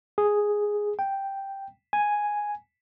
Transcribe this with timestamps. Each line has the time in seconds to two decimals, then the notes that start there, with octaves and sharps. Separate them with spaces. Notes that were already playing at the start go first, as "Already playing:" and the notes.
0.18 G#4
0.99 G5
1.93 G#5